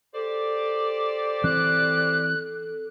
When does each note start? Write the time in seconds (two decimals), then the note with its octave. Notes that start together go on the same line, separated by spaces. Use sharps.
0.14 G4 A4 C5 D5
1.44 E3 C4 F#6